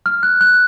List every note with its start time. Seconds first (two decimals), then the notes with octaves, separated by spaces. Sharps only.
0.06 F6
0.23 F#6
0.41 F#6